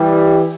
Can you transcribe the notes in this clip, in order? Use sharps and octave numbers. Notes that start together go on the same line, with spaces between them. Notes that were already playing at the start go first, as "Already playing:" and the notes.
Already playing: E3 G3